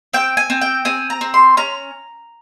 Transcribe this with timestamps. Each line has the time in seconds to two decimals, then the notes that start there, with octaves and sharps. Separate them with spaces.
0.13 C4 G5
0.37 G#5
0.50 C4
0.61 G5
0.85 C4 G#5
1.10 A#5
1.21 C4
1.34 C6
1.57 C#4 A#5